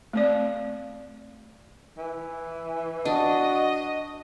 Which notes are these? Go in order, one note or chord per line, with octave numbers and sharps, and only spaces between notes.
A3 C4 D5
E3
D4 F#4 D#5